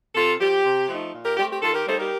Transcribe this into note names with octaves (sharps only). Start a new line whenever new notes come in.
C3 F4 A4
F3 C4 G4
C3
F3 A3 D#4
A#2
G4 A#4
A3 C4 G4
G4
D#3 F4 A4
G4 A#4
G3 A#3 D#4 A4 C5
G4 A#4